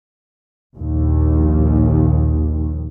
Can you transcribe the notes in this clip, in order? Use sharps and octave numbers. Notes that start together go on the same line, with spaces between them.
A#1 D#2